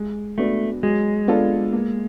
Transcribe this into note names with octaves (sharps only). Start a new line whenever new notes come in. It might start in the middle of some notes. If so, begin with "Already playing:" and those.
Already playing: G#3
A3 B3 D4 F#4
F#3 G#3
B3 D4 F4 A4
A#3